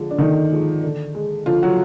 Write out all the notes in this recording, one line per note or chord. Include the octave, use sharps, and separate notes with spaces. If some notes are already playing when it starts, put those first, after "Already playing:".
Already playing: D3 F3 G#3
D4
D3 D#3 D#4
F3 G#3
D3
G#3
D3 F3 F4
F#3 F#4